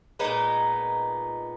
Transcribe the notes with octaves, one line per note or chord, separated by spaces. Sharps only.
A#2 G#3 B3 D#4